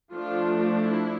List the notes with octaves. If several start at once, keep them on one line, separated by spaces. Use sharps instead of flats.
F3 A3 D4 F4
E4